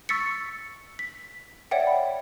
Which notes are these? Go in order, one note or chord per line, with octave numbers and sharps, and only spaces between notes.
C#6 E6 A6 B6 C#7
B6
C#5 D5 E5 F#5 G5
B5